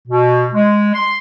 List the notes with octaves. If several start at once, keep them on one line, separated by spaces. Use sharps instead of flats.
B2
G#3
C6